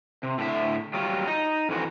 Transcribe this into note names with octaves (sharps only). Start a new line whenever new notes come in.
C3
A2 D3 E5
F#3 G3 F4
D#4 D#5
F2 E3 F#4